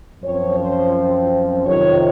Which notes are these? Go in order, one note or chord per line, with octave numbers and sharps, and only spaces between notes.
F#2 F3 C4 C#5
C5
F2 C3 D#3 C#5